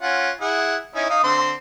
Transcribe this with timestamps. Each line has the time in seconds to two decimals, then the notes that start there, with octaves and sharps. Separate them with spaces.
0.02 C#4 F4 F#5
0.41 E4 G#4 F#5
0.95 C#4 D#4 E4
1.10 D#4 F5 D#6
1.24 D3 C4 C6